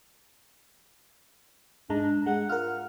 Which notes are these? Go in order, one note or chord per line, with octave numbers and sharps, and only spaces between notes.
G#2 G#3 D4 A#5
G#3 F#5
F4 A#4 F6